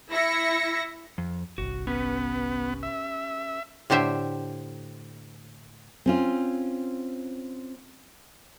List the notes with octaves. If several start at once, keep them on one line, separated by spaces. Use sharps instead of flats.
E4 E5 A#6 C#7
F2
G1 C2 F#4
B3 C#4 G4 B4
E5
A2 D3 G4 C5 E5
C4 C#4 F4